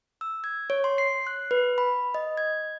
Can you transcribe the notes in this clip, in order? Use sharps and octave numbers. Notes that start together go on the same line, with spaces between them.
E6
G#6
C#5
C6
C7
F#6
B4
B5
D#5
G#6